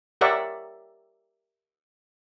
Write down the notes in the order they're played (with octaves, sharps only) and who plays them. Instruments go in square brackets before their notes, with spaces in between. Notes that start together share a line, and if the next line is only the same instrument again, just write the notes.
[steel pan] G4 A#4 C#5 D5 E5 F#5